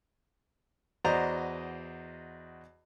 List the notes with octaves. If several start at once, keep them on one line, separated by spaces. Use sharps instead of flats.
E2 F#4 C5 D5 D#5 A#5